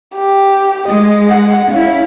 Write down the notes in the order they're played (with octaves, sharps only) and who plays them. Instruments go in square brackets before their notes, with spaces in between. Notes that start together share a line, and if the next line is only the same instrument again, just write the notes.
[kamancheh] G4
[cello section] G#3 [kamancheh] D#5
[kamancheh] F#5
[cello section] C#4 E4 [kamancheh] F5